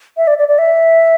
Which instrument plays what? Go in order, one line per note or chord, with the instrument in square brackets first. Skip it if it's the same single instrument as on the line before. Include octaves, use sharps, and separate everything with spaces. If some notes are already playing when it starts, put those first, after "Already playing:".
[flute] E5
D5
D5
D5
E5